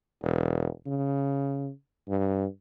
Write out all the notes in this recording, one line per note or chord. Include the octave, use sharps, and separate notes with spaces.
E1
C#3
G2